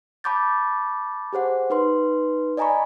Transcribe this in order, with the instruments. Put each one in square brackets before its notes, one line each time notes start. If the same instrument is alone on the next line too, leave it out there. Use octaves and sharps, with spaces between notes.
[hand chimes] A5 B5 C#6 D6 G6 A6
G4 G#4 C5 F#5
D#4 B4 C6
D5 D#5 G#5 A#5 B5 C#6